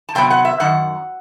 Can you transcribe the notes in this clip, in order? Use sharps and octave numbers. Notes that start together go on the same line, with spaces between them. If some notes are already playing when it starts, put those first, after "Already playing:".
A5
C3 F#3 B3 G5
F#5
E5
F#2 D#3 F#5